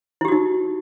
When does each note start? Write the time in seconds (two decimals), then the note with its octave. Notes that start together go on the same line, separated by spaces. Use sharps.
0.21 E4
0.25 G4
0.28 F#4
0.32 D#4